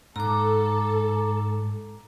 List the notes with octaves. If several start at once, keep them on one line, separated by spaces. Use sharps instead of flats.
G#2 A4 A#5 D6